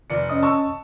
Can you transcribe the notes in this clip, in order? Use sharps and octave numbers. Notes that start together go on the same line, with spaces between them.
F1 D5 C#7
C#4 D#5 D#6
A5 C#6 E6